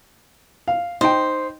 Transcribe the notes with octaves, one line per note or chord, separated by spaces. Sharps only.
F5
D#4 C5 G5